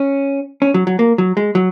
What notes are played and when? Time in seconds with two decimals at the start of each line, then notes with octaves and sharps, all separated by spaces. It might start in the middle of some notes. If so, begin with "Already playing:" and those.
Already playing: C#4
0.62 C#4
0.74 F#3
0.87 F#3
0.99 A#3
1.18 F#3
1.37 G#3
1.55 F#3